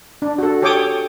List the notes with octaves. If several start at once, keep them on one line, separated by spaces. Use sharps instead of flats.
D4
F#4 A4
G4 A4 C#5 G5 D6 D#6